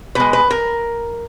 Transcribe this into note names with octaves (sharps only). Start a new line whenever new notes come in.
B2 G#3 B4
B4
A#4